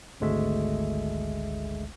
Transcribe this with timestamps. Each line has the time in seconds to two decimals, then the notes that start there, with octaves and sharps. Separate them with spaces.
0.20 G#1 D2 G#3 A3 E5